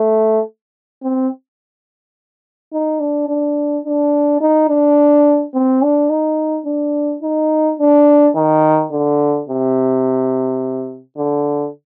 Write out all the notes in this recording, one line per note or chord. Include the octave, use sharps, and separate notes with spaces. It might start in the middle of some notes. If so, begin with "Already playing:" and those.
Already playing: A3
C4
D#4
D4
D4
D4
D#4
D4
C4
D4
D#4
D4
D#4
D4
D#3
D3
C3
D3